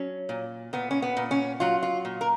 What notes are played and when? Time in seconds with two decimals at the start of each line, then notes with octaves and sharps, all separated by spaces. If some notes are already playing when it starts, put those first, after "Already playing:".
Already playing: F#3 C#4
0.29 A#2
0.73 A#2 B3
0.91 C#4
1.02 B3
1.17 A#2
1.31 C#4
1.60 F#3 F4
1.83 F4
2.05 A#2
2.21 A#4